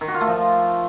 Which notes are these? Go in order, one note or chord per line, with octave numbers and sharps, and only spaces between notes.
D#3
F#4
F4
A3
F3